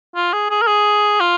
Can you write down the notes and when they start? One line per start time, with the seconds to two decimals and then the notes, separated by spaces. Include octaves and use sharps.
0.15 F4
0.33 G#4
0.50 G#4
0.61 A#4
0.67 G#4
1.20 F4